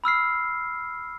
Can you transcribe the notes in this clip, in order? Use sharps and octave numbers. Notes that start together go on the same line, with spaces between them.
B5 E6 F6 C7